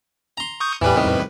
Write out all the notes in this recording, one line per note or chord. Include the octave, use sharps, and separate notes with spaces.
A#5 C6
C#6 D#6 G6
E2 A2 E3 G3 B4
C2 D#3